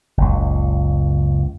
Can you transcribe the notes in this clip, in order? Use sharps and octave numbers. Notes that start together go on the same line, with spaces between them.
F#1 C#2